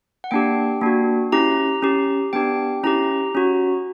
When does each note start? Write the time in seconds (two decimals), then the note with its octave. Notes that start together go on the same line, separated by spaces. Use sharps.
0.24 F#5
0.31 A#3 D4 G4 G5
0.81 A#3 D4 F#4
1.32 C#4 E4 G4 A#5
1.83 C#4 G4
2.33 B3 D4 G4 G5
2.83 C#4 E4 G4 A#5
3.35 C#4 F#4